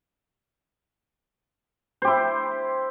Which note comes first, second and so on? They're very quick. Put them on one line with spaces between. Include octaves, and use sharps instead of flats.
C5 G4 E4